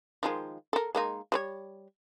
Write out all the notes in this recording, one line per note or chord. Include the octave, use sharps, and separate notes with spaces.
D#3 F3 G#3
A4 A#4
G#3 A#3 D#4
G3 B4 C#5